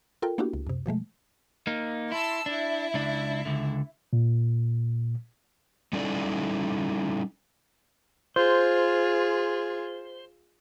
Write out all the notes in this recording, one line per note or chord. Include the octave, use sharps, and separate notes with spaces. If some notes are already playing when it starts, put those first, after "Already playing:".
F4 A4 A#4 G5
A#3 B3 D4 E4 F#4 G4
C#2
F#2 C3
B2 F3 G#3 A3
A#3 D#4
E4 A5 C6 E6
D4 E4 E5
C#2 D4
C#2 D3
A#2
G3 C#4 D#4 E4 A4 D5
F4 G#4 C5